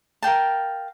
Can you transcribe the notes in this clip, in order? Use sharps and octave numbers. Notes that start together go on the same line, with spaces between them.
A#4 F5 G5 A5